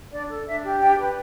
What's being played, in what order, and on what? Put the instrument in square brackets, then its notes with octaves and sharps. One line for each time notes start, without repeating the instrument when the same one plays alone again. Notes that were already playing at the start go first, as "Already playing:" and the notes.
[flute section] D4 D5
A4
D4 E5
G4
D4 G5
B4